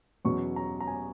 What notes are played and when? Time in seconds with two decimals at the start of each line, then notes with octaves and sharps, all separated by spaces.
0.25 E2 B2 F#3 C#4 C#6
0.56 A#5
0.80 A#5
0.87 G#5